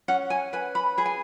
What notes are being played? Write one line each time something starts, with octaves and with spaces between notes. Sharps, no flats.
C#4 F#5
G#5
B4 G#5
B5
G#4 B5
G#5